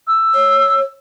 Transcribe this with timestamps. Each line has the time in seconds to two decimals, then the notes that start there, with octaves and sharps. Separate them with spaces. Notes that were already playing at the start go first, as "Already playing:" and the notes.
0.07 E6
0.34 C#5